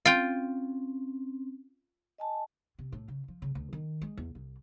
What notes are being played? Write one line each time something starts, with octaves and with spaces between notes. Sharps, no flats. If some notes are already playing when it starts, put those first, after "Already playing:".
C4 C#4 F4 G5
D#5 G#5 A5
C3
A2
C#3
F3
C#3
D2
D#3
G#3
E2
C2